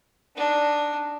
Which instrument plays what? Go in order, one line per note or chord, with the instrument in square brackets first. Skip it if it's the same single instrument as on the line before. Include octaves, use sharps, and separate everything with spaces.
[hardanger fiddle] D4 D#4